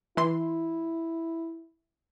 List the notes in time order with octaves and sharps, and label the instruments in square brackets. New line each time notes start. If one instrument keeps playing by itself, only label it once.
[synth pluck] E3 C6 [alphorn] E4